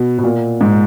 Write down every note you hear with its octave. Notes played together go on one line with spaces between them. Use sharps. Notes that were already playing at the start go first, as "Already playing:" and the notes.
Already playing: B2
B2
A#2
G#2